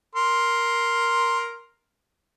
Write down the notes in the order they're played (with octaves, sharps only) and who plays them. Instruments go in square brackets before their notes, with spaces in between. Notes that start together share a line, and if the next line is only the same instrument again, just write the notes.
[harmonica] A#4 C6